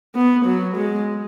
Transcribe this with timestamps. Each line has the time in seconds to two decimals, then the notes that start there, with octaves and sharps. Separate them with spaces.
0.15 B3
0.46 F#3
0.77 G#3